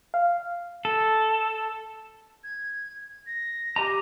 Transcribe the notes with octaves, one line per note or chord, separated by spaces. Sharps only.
F5
A4
G#6
A#6
G4 D#5 A#5